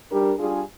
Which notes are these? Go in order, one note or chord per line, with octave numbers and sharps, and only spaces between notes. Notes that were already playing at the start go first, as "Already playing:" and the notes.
G3 D4 G4 A#4
G3 D4 F4 G#4